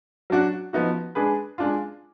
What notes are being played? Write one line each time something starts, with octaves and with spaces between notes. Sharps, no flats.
F#3 D4 F#4
F3 B3 D#4 F#4
G#3 D4 G#4 B4
G#3 D4 F4